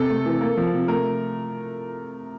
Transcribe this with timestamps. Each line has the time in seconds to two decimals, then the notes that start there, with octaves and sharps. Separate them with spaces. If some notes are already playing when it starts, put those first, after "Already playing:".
Already playing: C3 A4
0.10 A3
0.26 E3
0.41 A#3
0.57 F3
0.73 C3
0.88 A3 A#4